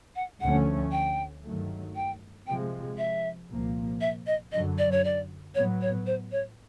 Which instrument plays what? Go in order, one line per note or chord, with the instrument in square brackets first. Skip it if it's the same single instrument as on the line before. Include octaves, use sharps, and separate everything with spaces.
[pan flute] F#5
[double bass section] D2 D3 F3 A3 C#4 [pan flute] F#5
[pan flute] G5
[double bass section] G2 D#3 F#3 A3
[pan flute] G5
[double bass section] C3 F3 G#3 [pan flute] G5
[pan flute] E5
[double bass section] C2 A#2 F3 A#3
[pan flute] E5
D#5
[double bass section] F#2 D3 F#3 [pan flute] D#5
[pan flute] D5
C#5
D5
[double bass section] A2 F#3 B3 [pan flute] C#5
[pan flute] C#5
C5
C#5